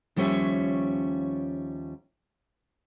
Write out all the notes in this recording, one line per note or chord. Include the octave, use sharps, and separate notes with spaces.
D#2 F3 G3 C#4 C#5 E5